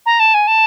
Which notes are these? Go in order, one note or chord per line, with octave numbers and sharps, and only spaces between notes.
A#5
A5
G#5
A5